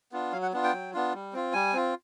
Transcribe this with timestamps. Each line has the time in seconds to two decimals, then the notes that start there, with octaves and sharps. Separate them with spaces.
0.12 B3 D4 F4
0.33 F#3 F5
0.42 F#5
0.53 B3 D4 F4
0.64 G5
0.73 F#3
0.93 B3 D4 F4
1.14 G3
1.33 C4 F4
1.53 G3 G#5
1.73 C4 F4